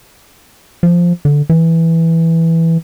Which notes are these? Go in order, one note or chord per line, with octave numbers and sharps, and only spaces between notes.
F3
D3
E3